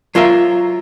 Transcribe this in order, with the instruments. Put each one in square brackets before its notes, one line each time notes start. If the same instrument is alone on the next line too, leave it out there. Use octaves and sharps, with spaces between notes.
[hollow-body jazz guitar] F#3 F4 A#4 E5